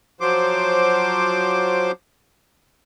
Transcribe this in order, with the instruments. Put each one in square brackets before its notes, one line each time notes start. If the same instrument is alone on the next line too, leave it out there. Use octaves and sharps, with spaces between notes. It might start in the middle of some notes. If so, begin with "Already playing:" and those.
[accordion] F3 F#3 C5 D6